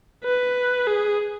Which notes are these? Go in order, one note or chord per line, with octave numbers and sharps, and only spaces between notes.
B4
G#4